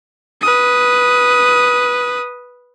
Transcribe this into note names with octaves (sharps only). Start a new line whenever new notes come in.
B4 D#6